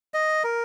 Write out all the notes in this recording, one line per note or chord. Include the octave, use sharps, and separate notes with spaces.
D#5
A#4